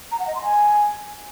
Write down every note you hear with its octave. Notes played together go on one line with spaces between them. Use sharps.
A#5
F#5
D#5
C6
G#5